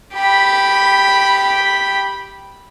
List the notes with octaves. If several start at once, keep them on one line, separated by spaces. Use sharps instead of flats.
G4 B5